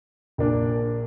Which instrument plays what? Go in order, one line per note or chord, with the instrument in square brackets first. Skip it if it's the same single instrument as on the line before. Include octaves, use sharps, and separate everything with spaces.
[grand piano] A#1 A#2 A#3 D4